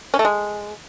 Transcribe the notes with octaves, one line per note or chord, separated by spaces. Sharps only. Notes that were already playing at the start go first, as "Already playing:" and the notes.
C#4
A3
G#3